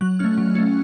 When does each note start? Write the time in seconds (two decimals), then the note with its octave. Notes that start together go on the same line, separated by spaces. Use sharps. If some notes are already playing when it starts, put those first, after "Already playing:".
0.01 F#3 F#6
0.19 A3 C#4 F6
0.38 F#3
0.55 A3 C#4